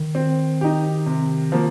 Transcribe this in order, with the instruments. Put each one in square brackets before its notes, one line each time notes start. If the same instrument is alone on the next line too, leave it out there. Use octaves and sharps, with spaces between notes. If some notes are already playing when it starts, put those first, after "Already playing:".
Already playing: [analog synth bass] D#3
[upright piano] C4
D#4 G4
C3
F3 A#3